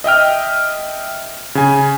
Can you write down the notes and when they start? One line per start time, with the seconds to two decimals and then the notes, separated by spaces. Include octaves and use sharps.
0.04 D#5 E5 G5 F6
1.55 C#3 G#5